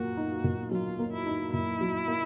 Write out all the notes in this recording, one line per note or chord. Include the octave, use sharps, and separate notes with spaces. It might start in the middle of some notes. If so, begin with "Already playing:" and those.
Already playing: A#2 F#3 A#3 F#4
D#4
A#2
F#3 F4
A#3
E4
D#4
A#2 E4
F#3
A#3